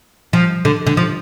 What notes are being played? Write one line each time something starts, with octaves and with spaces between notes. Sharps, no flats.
F3
D3
D3
F3